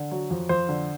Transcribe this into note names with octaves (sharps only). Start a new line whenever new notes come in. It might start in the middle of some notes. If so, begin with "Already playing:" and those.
Already playing: D3
F#3
F2
F2 C5
D3